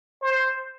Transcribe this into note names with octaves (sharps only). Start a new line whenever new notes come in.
C5